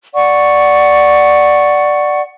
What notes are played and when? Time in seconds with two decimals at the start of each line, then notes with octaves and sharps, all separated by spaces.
0.13 D5 F#5 C#6